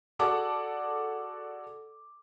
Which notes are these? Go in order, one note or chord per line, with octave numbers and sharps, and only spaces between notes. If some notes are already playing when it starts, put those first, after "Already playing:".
F#4 G#4 A4 D5 F#5 D6